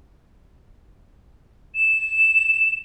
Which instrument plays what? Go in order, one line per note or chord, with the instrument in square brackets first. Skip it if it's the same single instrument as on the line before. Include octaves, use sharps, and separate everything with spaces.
[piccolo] E7